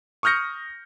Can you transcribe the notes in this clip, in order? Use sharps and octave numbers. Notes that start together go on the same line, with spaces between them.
C#6 D#6 F6 G6 A#6 C#7